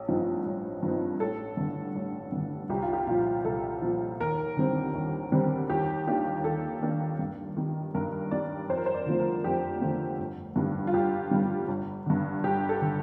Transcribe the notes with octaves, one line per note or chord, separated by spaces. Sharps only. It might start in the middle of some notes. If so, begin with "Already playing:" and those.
Already playing: A1
G2 F3 C4 D#4
A1
G2 F3 C4 D#4
A1 A4
G2 D3
A1
G2 D3
C2 G4
F4
G4
A#2 F3 F4
C2 A4
A#2 F3
D#2 A#4
D3 G3 C4
D#2
D3 G3 C4
D#2 G4
D#3 A#3 D4 G4
D#2 A4
D#3 A#3 D4
G2
D#3 G3
G2 A#4
D#3 G3 D5
F2 C5
A#4
C5
D5
D3 F3 A3
A#4
F2 G4
D3 F3 A3
G1
G2 D3 G3
F4
G1 G4
G2 D3 G3
G1
G2 D3
G1 G4
A4
D3